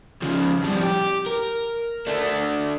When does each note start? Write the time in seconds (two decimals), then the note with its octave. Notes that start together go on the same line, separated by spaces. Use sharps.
0.22 C#3 F3
0.62 F2 G3
0.83 G4
1.26 A#4
2.07 A3 D4